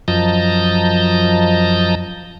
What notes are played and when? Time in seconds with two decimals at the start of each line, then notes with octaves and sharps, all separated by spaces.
0.08 F#2 F3 D#5 A5 A#5 G6